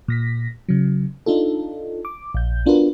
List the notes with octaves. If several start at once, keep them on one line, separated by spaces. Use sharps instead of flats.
A#2 A#6 B6
C#3 F#3
D4 D#4 F4 A4
D6
A#1 G6
B3 D4 F4 F#4 A#4 B4